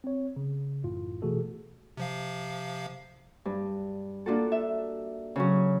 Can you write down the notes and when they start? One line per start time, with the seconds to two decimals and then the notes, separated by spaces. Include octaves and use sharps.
0.04 C4 C#5
0.36 C#3
0.83 A1 F#2 A2 F4
1.22 B2 E3 A3 F#4 G#4 A4
1.97 C3 F3 F5
3.45 G2
4.26 A#3 D4 F4 F#4 A4
4.52 E5
5.36 C#3 F#3 C#4